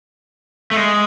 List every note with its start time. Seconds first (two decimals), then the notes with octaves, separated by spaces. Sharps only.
0.71 A3
0.76 G#3